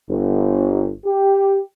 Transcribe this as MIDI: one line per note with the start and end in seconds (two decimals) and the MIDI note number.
0.10 0.90 31
1.06 1.59 67